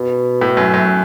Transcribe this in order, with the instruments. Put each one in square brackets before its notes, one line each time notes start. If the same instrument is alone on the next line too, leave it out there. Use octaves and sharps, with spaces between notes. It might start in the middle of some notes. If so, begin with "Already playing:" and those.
Already playing: [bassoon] B2
[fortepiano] A2
F#2
F#2